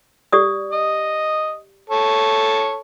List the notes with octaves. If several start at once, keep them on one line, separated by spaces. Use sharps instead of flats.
G4 D5 D#6
D#5
A4 C#5